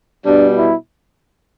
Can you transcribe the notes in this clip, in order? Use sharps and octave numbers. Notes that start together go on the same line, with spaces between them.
B2 G3 D4
E4